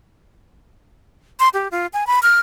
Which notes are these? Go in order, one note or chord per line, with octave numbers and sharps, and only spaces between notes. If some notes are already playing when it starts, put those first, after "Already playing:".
C6
G4
F4
G#5
B5
F6